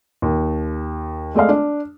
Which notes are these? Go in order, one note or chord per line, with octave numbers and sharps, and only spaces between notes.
D#2
G#3 A3 D5 D#5 F5
D4